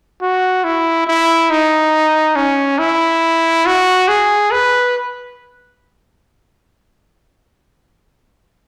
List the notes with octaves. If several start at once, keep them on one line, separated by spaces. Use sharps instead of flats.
F#4
E4
E4
D#4
C#4
E4
F#4
G#4
B4